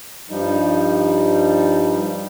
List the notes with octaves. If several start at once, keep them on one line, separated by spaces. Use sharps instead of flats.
G2 F3 G3 D#4